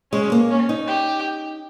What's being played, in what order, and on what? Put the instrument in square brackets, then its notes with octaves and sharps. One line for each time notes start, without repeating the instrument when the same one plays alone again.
[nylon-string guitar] G#3 [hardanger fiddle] C#4
[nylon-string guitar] A#3
[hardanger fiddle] C#4
[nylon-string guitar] D#4
[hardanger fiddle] G4